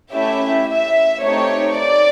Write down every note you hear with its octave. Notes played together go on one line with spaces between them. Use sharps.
A3 C#4 E4 G4 E5
E5
A3 C4 D#4 G4 C#5
D5